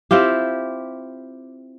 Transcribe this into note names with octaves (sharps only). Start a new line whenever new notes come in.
C4 E4 F4 G4